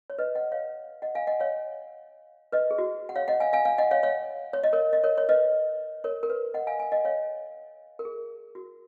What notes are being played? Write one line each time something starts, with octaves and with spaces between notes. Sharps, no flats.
C#5
B4 D#5
D#5 F#5
C#5 F5
D#5 F#5
F5 G#5
D#5 F#5
C#5 F5
B4 D#5
G#4
F#4
F#5
C#5 F5
D#5 F#5
F5 G#5
F5 G#5
F5 G#5
D#5 F#5
C#5 F5
C#5 F5
C#5
D#5
A#4 C#5
D#5
A#4 C#5
C#5
B4 D#5
A#4 C#5
A#4
B4
D#5 F#5
F5 G#5
F5 G#5
D#5 F#5
C#5 F5
A#4
G#4
F#4